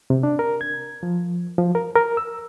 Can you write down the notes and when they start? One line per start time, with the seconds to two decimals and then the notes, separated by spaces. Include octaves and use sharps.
0.10 C3
0.23 D4
0.39 A#4
0.61 G#6
1.03 F3
1.58 F3
1.75 A#4
1.96 A#4
2.17 E6